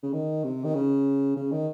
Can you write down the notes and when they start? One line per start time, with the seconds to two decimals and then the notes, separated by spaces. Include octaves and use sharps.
0.03 C#3
0.13 D#3
0.44 C3
0.64 D#3
0.75 C#3
1.37 C#3
1.52 D#3